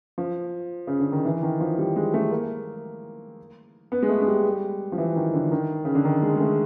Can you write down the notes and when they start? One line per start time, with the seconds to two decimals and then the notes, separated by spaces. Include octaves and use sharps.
0.18 F3
0.87 C#3
1.00 D3
1.12 D#3
1.25 E3
1.43 D#3
1.60 F3
1.78 G3
1.96 G#3
2.14 A3
2.31 A#3
3.92 B3
4.03 G#3
4.09 A3
4.21 G#3
4.28 G3
4.92 F3
4.98 E3
5.16 D#3
5.34 D3
5.51 D#3
5.85 C#3
5.95 D3
6.05 D#3
6.23 G#3
6.36 G#3
6.40 A3